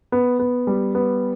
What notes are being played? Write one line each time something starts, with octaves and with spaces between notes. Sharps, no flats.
B3
B3
G3
B3